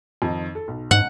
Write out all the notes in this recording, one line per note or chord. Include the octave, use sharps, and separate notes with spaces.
F2 D#3 D#4
A4
B1
G#2 F#5